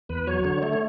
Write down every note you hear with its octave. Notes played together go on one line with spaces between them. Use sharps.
E2 B4
F#3 C#5
D3 C#5
A3 C#5
C#5